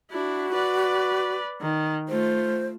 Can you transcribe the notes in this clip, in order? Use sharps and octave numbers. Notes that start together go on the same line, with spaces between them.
D4 E4 F#4
B4 D5
D#3
A3 F4 C5